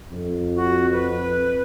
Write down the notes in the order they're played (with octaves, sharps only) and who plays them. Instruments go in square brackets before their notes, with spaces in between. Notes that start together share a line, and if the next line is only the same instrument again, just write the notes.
[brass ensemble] F2
[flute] F#4
B4